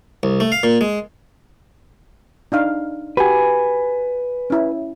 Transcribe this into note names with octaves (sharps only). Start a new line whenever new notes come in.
C2
A3
F5
A#2
G#3
D4 D#4 F5
F#4 G4 B4 G#5
C#4 E4